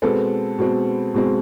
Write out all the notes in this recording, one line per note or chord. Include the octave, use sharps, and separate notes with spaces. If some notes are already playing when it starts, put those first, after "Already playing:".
B2 G#3 C4 A4 B4
B2 G#3 C4
B2 G#3 C4